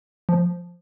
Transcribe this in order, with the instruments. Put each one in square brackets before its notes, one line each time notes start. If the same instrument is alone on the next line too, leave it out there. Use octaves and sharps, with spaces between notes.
[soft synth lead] F3